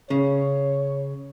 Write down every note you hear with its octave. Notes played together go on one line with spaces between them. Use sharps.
C#3 C#5